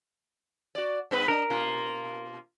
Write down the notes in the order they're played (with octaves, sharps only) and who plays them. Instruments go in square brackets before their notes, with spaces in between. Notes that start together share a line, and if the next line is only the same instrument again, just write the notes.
[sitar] F#4 D5
G2 B3 B4
[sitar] D4 D#5 [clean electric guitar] A#4
[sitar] B2 A#3 F4